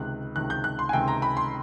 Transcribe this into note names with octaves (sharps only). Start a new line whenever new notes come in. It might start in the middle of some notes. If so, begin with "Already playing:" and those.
Already playing: C#2 C3 D#3 F#6
C#2 C3 D#3 F#6
G6
F#6
C6
G#5
C#2 C3 D#3 G5
A#5
B5
C6